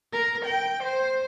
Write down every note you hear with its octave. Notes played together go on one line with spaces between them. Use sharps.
A#4
G5
C5